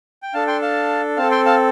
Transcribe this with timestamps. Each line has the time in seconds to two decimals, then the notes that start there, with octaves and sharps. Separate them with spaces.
0.23 G5
0.34 D4 A4 F5 A5
0.47 G5 C6
0.62 F5 A5
1.17 C4 A4 F5 A5
1.31 G5 C6
1.45 F5 A5